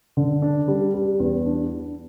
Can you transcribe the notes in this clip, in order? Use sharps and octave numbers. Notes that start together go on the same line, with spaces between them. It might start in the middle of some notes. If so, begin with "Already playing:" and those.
D3
D4
G3
G3
E2
D4
D4